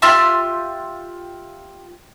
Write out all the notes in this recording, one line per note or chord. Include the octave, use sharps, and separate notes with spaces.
F4 G4 E5 C6